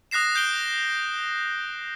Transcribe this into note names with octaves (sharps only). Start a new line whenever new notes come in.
D#6 F#6 A#6 C7 E7
G6 C7 D7 G7